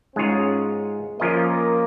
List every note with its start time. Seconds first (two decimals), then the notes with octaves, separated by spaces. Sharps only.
0.16 G#2 G#3 C#4 F4 G#4 C#5
1.19 F3 A#3 C#4 F4 A#4 D#5